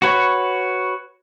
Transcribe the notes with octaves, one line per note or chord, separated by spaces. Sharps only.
F#4 B4 C#5